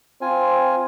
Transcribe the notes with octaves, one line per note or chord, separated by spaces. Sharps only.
C4 F4 G#5